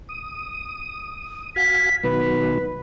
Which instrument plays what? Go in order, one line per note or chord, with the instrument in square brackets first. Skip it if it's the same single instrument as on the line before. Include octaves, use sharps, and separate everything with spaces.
[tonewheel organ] D#6
[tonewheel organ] F#4 F5 G#5 [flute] B6
[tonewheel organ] B2 D#3 F#3 [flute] B4